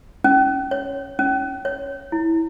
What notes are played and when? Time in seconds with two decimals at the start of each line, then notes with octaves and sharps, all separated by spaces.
0.24 C#4
0.71 C#5
1.19 C#4
1.65 C#5
2.12 E4